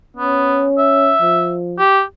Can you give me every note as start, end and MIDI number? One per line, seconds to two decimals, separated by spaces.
0.17 0.66 59
0.17 1.14 61
0.78 1.54 76
1.22 1.79 53
1.79 2.01 67